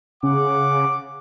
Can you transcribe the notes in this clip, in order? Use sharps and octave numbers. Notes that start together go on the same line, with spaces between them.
C#3 F#5 D6